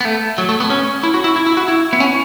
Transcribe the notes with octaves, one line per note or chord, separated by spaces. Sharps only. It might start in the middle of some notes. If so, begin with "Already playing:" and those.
B3
A3
F#3
A3
B3
C#4
E4
F#4
E4
E4
E4
F#4
E4
B3
C#4